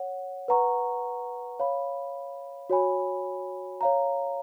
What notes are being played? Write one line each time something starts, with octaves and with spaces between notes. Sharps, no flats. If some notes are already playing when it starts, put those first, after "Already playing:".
Already playing: C#5 F#5
B4 F#5 A#5 C#6
C#5 F5 B5
F#4 C#5 G#5 B5
C#5 F5 A#5